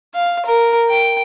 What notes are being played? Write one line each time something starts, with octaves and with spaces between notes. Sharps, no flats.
F5
A#4
G5